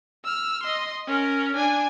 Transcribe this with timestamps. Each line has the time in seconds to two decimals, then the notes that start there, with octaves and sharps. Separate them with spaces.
0.25 E6 F6
0.64 D#5 C6
1.07 C#4 A#4
1.56 D4 G#5